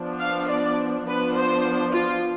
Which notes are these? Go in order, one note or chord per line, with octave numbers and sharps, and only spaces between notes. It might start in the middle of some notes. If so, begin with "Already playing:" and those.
Already playing: F3 B3 D4
F5
D5
F3 B3 D4 B4
C5
F4